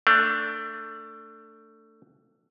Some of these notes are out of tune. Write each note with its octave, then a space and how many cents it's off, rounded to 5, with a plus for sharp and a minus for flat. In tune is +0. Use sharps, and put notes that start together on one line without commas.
A3 +20 D4 +0